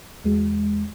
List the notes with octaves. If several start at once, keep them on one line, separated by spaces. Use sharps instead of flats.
E2 G#3 F#4